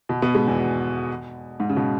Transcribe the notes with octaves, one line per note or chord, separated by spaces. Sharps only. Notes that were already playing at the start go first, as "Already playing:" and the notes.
B2
B2 B3
G#2 G#3
E2 E3
G#2
C#3
B2